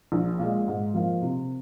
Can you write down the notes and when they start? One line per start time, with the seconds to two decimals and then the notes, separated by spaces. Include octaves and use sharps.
0.12 A#1
0.39 A#2 G#3
0.67 G#2
0.94 F3 A#3 F4
1.22 C3